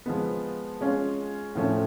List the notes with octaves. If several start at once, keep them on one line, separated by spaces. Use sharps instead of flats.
F3 G#3 B3
G#3 C#4 F4
A2 F3 A3 C#4